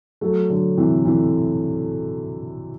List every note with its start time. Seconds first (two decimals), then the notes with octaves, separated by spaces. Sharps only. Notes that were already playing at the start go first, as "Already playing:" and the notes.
0.21 F#3 A3
0.49 D3 F#3
0.78 C3 E3
1.05 C3 E3